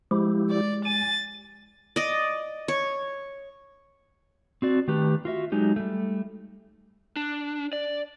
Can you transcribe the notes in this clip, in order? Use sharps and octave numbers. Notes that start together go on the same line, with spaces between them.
F3 G#3 E4 G4
D5
G#5 A6
D5 D#5
C#5
C4 F#4 D5
D#3 A3 G4 B4
F4 F#4 E5
F#3 G#3 D#4 G4
G3 A3
D4
D5